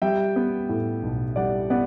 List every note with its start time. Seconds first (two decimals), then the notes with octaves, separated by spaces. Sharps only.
0.02 G3 E5 G5
0.36 B3
0.69 A2
1.03 B1
1.36 G3 D5 F#5
1.70 B3 D5 F#5